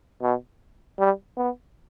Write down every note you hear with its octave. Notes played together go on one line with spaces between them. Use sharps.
B2
G3
B3